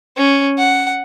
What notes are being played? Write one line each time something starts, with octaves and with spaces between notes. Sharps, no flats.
C#4
F#5